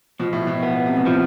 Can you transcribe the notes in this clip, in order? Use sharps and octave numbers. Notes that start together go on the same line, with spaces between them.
B2 F3
A2
B2
B3
C3
B2
A2 F3